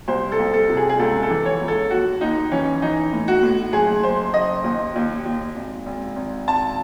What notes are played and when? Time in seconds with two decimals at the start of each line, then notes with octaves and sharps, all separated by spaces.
0.08 C2 C5
0.32 A4
0.39 C2
0.53 A4
0.69 C3
0.77 G#4
0.89 G#4
0.99 C#2 A4
1.23 A4
1.30 E3
1.46 C#5
1.61 C#2
1.68 A4
1.90 D#2 F#4
2.21 D#2 D#4
2.52 E3 C#4
2.82 E3 D#4
3.13 A2
3.28 F#4
3.43 A2
3.73 F#1 G#4
4.03 F#1 C5
4.34 F#1 D#5
4.64 D#2
4.96 D#2
5.25 D#2
5.56 G#1
5.86 G#1
6.16 G#1
6.48 G#1 A5